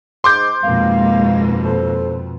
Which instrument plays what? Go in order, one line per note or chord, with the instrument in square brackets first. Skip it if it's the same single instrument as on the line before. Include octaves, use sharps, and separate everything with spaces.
[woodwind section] G#2 [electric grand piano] C6 D6 G6
[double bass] F2 B2 [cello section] G#2 A#3 [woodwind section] F5
[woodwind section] A4 C5